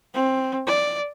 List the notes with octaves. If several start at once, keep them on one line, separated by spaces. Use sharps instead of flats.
C4
D5